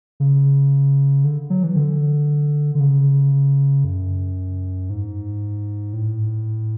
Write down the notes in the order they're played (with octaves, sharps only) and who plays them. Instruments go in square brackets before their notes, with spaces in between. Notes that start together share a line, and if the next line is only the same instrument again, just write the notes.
[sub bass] C#3
D3
F#3
E3
D3
D3
C#3
F#2
G#2
A2